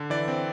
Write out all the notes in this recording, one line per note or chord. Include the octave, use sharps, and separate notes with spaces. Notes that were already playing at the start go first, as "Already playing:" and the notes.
Already playing: D3
E3 D5
C4